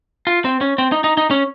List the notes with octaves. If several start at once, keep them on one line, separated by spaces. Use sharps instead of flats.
F4
C4
C#4
C4
D#4
D#4
D#4
C#4